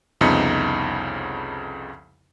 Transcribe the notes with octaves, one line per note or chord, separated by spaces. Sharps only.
C2 F2 C#3 B3 D#4 C#7